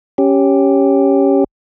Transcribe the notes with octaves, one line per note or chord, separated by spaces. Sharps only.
C#4 G4